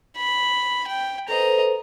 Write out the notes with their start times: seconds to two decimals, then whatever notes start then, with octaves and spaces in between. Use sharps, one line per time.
0.17 B5
0.87 G5
1.28 A4 B4 C5 D#5 A#5